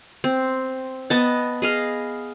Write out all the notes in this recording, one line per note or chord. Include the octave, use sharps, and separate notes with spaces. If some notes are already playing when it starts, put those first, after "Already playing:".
C4
B3 D#5 A5
G#4 D#5 F5